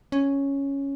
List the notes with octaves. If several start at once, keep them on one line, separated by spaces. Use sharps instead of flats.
C#4